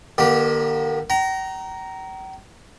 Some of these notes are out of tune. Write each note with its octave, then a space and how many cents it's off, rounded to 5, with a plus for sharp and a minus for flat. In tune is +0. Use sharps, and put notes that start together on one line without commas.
D#3 -40 A#3 +40 G4 -5
G5 -45 A#5 +0